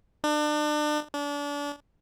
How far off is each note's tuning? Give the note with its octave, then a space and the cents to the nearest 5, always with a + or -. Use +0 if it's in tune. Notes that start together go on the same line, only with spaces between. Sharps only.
D4 +35
D4 -30